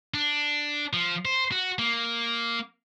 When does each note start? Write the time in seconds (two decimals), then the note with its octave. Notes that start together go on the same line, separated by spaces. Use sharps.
0.14 D4
0.93 F3
1.25 C5
1.52 F#4
1.78 A#3